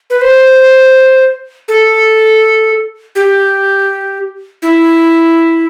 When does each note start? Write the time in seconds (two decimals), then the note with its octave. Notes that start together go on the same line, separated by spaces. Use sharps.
0.10 B4
0.21 C5
1.68 A4
3.15 G4
4.62 E4